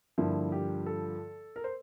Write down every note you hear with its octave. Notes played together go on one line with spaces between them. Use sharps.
G2 D3 F3 A#3 E4
G4
A4
A#4
C5